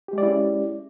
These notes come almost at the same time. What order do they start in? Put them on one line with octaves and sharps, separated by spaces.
G4 G#3 D5 E4 C#4